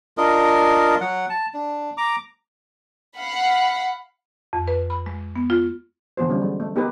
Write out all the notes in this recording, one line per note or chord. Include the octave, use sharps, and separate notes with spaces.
D4 F4 A#4 D#5
F#3 F#5
A5
D4
A#5 D6
F5 F#5 B5
F2
B4
B5
G#3
B3
F4
D3 E3 B3 F#4 C5
D3 G3 C#4
F#3 G#3
A3
B3 D#4 G4 G#4 A#4 B4